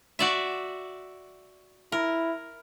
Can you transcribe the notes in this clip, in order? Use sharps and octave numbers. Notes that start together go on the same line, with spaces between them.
F#4 D5 E5
E4 A#4